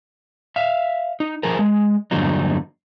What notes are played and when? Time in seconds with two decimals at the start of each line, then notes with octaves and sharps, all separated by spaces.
0.56 E5 F5
1.20 D#4
1.43 F3 G#4 A#4
1.59 G#3
2.11 E2 G2 D3 F#3 A#3 D#4